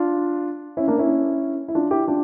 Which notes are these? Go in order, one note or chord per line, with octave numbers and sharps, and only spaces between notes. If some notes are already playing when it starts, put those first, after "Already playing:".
Already playing: D4 F4
C#4 E4
A#3 D4
C#4 E4
E4
D4 F4
E4 G4
D4 F4